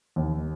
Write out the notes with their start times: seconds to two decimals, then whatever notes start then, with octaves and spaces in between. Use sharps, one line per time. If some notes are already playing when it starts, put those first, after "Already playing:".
0.16 D#2